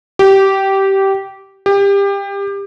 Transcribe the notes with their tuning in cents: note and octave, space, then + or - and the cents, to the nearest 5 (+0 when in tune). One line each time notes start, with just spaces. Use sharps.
G4 -15
G4 +25